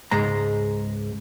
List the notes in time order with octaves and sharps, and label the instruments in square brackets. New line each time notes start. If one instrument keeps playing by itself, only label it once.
[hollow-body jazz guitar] C#2 G#2 G#3 A#5